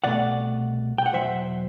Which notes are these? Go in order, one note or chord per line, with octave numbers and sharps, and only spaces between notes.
C2 B2 A3 D5 F#5
G5
F#5
E2 B2 F#3 C5 E5